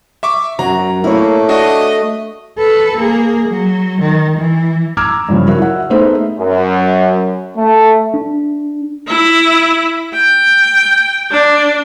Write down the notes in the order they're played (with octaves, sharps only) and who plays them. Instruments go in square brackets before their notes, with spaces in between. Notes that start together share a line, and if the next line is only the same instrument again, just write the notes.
[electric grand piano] E5 C#6 D6
[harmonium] F#2 [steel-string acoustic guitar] F#3 [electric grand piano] A#5
[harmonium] A3 [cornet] A#3 [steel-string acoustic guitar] E4 C#5
[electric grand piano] D4 F#4 [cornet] D#5
[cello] A4 B4
A#3 G#4
F#3
D#3
E3
[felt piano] A#5 D6 E6 F6 G#6
G2 C#3 F3 F#3
E4 F#4 A#4 E5
F#5
A3 B3 D#4 G#4 C5 E5
[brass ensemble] F#2
A3
[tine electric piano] D4
[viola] E4
G5
D4